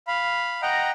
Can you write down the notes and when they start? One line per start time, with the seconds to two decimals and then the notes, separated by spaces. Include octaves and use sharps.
0.07 F5 B5
0.62 D#5 F#5 G5 A#5